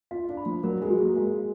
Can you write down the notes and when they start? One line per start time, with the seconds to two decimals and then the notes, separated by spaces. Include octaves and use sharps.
0.11 F4 F5
0.29 D4
0.37 B5
0.46 F3
0.64 F#3 A#4
0.82 G#3
0.90 F#4
0.99 A#3
1.16 G#3 F5